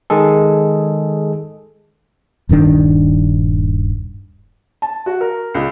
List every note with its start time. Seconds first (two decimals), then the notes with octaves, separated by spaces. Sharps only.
0.10 D#3 G#3 G#4 A4
2.49 D#1 G2 D#3 D4
4.82 A5
5.06 F#4
5.21 A#4
5.54 C#2